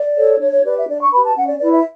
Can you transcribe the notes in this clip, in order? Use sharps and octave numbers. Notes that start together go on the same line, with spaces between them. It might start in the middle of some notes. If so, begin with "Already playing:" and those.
Already playing: D5
A4 C#5
D4 C#5
C#5
G4 B4 D5
E5
D4 D5
C#6
G4 B4 B5
A5
C#4 F#5
D5
E4 B4 D5
E5